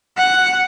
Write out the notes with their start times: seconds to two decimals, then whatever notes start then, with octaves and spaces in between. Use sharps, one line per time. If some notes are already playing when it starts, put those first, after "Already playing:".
0.17 F#5